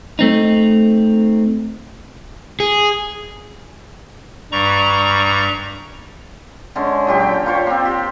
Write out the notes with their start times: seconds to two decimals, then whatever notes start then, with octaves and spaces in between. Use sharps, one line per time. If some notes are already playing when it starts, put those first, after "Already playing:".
0.19 A3 C4 D#4
2.60 G#4
4.52 G2 G3 A#5 C#6
6.76 D3 G#3 C#4
7.07 A#2 F#3 G4
7.20 G5
7.46 A#3 F4 C5 C#5
7.67 A#3 C4
7.85 G4